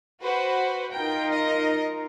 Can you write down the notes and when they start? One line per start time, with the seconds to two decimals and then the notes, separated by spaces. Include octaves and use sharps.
0.22 F#4 B4 C5
0.93 D#4 F4 A#4 G5
1.34 D#5